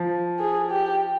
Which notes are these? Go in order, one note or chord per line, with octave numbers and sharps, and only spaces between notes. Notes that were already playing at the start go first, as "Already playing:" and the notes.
Already playing: F3
G#4
G4